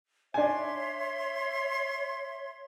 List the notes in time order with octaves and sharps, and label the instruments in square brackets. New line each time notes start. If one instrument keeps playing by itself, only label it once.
[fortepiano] D4 G#5 [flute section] C#5 E5 C6